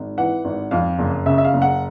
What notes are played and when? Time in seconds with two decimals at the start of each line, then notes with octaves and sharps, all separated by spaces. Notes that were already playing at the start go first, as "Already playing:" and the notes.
Already playing: G#1
0.17 E3 F#5
0.44 G#1
0.71 F2 F5
0.99 F#1
1.26 C#3 E5
1.38 E5
1.44 F5
1.53 F#1
1.62 F#5